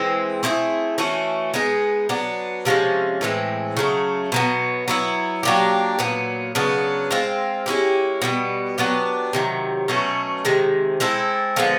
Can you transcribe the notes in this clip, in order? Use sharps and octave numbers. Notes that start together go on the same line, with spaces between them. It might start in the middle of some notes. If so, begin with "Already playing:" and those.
Already playing: E3 G#3 C4
A3 C4 E4 G#4
E3 A3 C#4 F#4
G#3 B3 D#4 G#4
F#3 B3 D4
C3 F3 G#3 C#4
A2 E3 G#3 C4
C#3 F#3 A3
B2 F#3 B3
F#3 B3 E4
F#3 A#3 D4 G4
A#2 F#3 B3
C#3 F#3 B3 D4
G#3 C4 F4
G#3 C#4 E4 G4
B2 G3 B3
F#3 B3 D4 G4
C3 D#3 F#3
B2 F#3 A3 C#4
C3 D#3 G#3
G#3 C4 E4 A4
D3 F3 G#3 B3